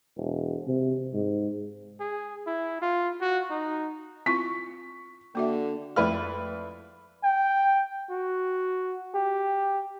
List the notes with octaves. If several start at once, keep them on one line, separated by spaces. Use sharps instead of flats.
E1
C3
G#2
G#4
E4
F4
F#4
D#4
C4 E4 F4 C#6 B6
D3 A#3 F#4 E5
F2 E4 B4 D5 F6
G5
F#4
G4